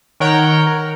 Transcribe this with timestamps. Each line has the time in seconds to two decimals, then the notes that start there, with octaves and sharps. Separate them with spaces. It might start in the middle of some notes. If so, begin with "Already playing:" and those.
0.20 D#3 A#4 C#5 F#5 G5
0.67 A#4